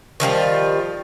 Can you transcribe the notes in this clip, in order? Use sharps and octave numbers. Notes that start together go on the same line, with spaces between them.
D#3 F3 G3 F4